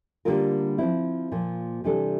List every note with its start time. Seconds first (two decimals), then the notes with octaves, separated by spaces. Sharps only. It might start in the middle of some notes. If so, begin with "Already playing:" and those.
0.25 D3 G3 A#3 F4 A#4
0.78 F3 C4 E4
1.32 A#2 F3 A#3
1.84 C3 E3 G3 D4 A4